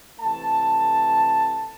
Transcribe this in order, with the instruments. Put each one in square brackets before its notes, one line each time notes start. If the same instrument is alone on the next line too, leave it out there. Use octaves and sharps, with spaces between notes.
[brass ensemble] C3 E3 A3 A5